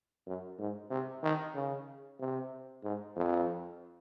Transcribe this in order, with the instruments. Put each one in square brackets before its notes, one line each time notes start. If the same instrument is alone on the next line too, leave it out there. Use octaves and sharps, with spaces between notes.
[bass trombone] F#2
G#2
C3
D#3
C#3
C3
G#2
F2